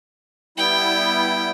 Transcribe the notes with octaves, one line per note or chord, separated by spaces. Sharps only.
G3 B3 E4 G5